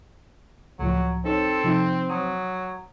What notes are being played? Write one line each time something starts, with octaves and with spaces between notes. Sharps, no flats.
C#2 A2 F3 F#3
C4 D#4 A4 C#5
C3 F3 D#4
F#3 D#6